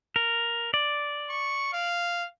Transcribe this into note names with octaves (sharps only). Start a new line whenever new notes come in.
A#4
D5
C#6
F5